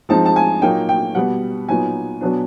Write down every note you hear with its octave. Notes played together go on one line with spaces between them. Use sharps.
F3 G#3 C4 D#4 A5
A5
G#5
A#2 F#3 A#3 D#4 G5
G5
B2 G3 B3 F#5
A#2 F#3 B3 D#4 G#5
B2 F#3 B3 D4